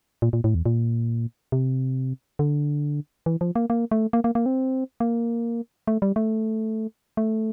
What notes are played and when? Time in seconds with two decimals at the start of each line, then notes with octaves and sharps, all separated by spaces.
0.22 A#2
0.33 A#2
0.44 A2
0.55 E2
0.66 A#2
1.52 C3
2.39 D3
3.26 E3
3.41 F3
3.56 A#3
3.70 A#3
3.91 A3
4.13 A#3
4.24 A#3
4.35 A#3
4.46 C4
5.00 A#3
5.87 A3
6.02 G3
6.16 A3
7.17 A3